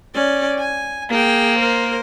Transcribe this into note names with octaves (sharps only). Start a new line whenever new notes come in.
C#4 D5
G#5
A#3 G#4 G5
A#4 C5